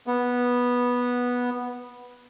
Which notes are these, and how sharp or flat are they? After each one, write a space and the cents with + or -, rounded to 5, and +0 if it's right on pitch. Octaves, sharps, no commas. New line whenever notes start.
B3 -10